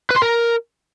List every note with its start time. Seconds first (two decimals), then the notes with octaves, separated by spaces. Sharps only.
0.11 B4
0.16 C6
0.22 A#4